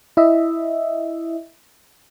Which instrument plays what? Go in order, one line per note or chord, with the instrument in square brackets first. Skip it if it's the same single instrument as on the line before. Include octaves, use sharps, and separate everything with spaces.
[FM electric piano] E4 D#5 E5